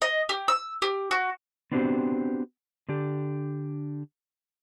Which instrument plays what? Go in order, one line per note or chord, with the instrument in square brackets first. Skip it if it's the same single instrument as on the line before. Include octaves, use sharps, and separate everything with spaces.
[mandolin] D#5
G4
E6
G4
F#4
[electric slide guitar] B3 C4 D4 F#4 G4 C5
D3 D4 G4